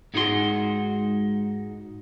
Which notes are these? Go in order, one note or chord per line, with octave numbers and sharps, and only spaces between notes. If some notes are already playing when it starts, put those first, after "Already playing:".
G#2 G#3 D#4 F#4 G#4 C6